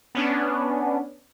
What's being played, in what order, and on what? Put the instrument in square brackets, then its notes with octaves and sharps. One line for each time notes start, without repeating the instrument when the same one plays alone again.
[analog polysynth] B3 C#4 D4